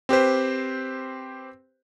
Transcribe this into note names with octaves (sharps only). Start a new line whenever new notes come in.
C4 G4 B4 C5